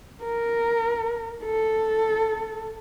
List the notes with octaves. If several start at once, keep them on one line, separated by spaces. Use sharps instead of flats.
A#4
A4